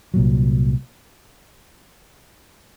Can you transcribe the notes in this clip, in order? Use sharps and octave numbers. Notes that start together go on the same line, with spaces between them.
C2 A#2 F#3